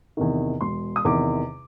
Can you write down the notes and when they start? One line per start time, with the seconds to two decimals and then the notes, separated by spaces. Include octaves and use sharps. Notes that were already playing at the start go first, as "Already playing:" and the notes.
0.17 E2 C3 D#3
0.61 E1 C6
0.96 D#6
1.05 E2 C3 D#3 D6